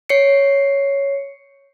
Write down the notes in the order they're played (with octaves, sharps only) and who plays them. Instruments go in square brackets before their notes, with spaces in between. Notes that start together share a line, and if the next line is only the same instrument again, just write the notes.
[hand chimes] C#5 C7 C#7